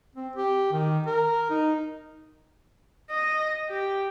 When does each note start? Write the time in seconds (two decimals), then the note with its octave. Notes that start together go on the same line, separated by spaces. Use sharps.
0.16 C4
0.36 G4
0.73 D#3
1.06 A#4
1.50 D#4
3.10 D#5
3.70 G4